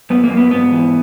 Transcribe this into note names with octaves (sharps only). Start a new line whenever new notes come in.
F#2 B3
A#3
F#2
B3
G#2 B3
E3